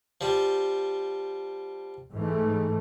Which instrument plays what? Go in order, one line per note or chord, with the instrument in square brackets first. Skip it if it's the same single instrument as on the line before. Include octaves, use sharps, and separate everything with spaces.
[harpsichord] F3 G3
[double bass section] G#2 E3 A3